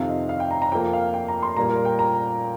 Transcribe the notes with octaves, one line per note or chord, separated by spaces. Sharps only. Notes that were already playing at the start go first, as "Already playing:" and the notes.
Already playing: F2 C3 D#3 C4 F5
D#5
F5
G5
A#5
A#5
F2 F3 A#3 G5
F5
G5
A#5
C6
A#2 G3 A#3 A#5
A#4
G5
A#5